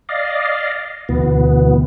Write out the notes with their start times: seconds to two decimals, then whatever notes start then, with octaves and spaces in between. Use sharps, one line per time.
0.09 D5 D#5 F5
1.09 D2 B2 E3 B3